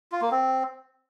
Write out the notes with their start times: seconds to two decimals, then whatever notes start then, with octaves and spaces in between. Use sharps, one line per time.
0.12 F4
0.22 A#3
0.31 C4